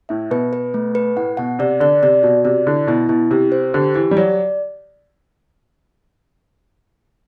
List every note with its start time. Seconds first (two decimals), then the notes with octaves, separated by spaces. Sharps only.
0.09 A2 E5
0.31 B2 B4
0.53 B4
0.74 A3
0.95 B4
1.17 A2 F#5
1.37 B2 F#5
1.59 C3 D5
1.80 D3 D5
2.03 C3 D5
2.23 B2 F#4
2.44 C3 D5
2.67 D3 E4
2.87 B2 E4
3.09 B2 E4
3.31 C3 G4
3.52 C5
3.74 D3 G4
3.94 E3 G4
4.11 G3
4.17 F#3 D5